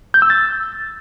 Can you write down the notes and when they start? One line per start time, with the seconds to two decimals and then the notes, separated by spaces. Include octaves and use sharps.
0.14 G6
0.22 E6
0.30 A6